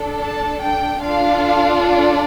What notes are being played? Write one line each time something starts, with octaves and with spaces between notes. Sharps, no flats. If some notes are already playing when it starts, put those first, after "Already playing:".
Already playing: D4 A4
A5
G5
D4 F4 A4 F5
D5